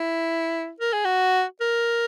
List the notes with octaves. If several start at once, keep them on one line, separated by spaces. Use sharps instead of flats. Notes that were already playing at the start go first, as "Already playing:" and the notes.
Already playing: E4
A#4
G#4
F#4
A#4